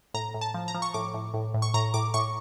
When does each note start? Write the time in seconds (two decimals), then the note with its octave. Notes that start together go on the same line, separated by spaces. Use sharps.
0.14 A2 A#5
0.34 A2
0.41 A5
0.54 F3
0.68 A#5
0.75 F3
0.82 C#6
0.94 A2 D6
1.14 A2
1.34 A2
1.54 A2
1.62 C#6
1.74 A2 A#5
1.94 A2 D6
2.14 A2 C#6